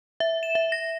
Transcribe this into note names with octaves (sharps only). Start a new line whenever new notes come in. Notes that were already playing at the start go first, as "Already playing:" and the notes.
E5
E7
E5
A#6